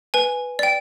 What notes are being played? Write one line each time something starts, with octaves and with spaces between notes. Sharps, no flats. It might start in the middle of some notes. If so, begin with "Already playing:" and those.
B4 G#5
D5 G5